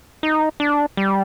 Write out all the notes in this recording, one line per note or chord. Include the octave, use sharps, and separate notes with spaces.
D#4
D4
G3